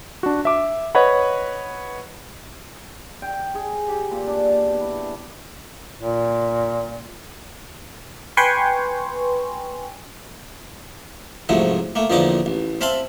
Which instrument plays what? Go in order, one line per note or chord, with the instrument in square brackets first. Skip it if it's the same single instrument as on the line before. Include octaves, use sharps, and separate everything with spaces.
[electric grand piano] D4 F#4
E5 D6
B4 C#5 D#5 F#5 B5
[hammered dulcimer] G5
G#4
G4
A#2
D4
A5
B2
E4
[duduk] A#2
[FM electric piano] B4 G5 G#5 C6 C#6
[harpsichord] C2 G#2 F3 F#3 A3
A3 A#3
E2 A#2 D3 F3 D#4 D6
A1
C4 E5 F5 A5 B5 C6